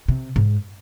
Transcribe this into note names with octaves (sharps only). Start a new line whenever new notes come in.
C3
G#2